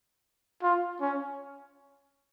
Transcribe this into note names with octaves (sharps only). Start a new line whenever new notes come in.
F4
C#4